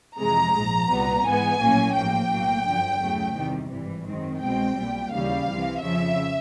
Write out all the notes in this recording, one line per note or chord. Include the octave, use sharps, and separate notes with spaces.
F2 C3 E3 G#3 A#5
A#1 G#2 F3
C2 A#2 G3 B3
G#2 E3 G#3 B3 G#5
A#1 A2 F#3 A#3 C#4
A1 G#2 F3 A#3 G5
B1 A2 F#3 A#3
G1 F#2 D3 F3
E2 C#3 F#3 A3
E2 C3 D#3 G3
G#1 G2 E3 G3
F#2 D#3 G#3 C4
C2 B2 G#3 C4 G5
B1 A#2 G3
D#2 C#3 E3 G3 F5
C2 C3 E3
F2 C#3 F3 E5